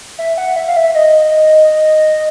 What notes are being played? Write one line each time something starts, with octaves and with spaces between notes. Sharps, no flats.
E5
F#5
E5
F5
E5
D#5